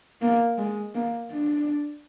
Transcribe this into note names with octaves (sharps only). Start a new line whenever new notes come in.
A#3
G#3
A#3
D4